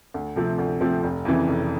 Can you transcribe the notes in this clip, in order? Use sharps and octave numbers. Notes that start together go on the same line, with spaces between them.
D2
C3 F3 A3 C4
D2
C3 F3 A3 C4
F1
F2 C#3 E3
F1